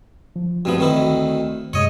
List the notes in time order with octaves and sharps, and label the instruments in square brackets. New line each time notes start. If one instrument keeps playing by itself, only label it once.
[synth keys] F3
[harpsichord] G2 F3 B3 [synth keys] A3 C4 F#4
[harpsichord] D2 D#3 E4
[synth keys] F#2 C3 G#3 [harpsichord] C#5 D#5